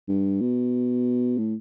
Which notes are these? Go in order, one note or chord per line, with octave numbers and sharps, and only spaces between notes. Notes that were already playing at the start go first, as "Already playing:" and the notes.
G2
B2
A2